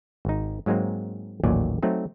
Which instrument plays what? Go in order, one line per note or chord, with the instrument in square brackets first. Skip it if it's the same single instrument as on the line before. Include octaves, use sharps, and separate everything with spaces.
[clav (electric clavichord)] G#1 D#4
G#2 F#3 G#3 A#3 C4
A1 D#2 A#2 F#3 D5 G#5
F#3 A3 C4 D#4